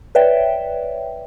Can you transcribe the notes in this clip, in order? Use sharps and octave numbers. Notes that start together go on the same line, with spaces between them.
B4 C#5 D5 E5 G5